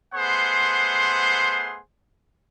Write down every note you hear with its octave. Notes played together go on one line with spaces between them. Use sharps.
A3 B3 G#4 C5 F#5 C6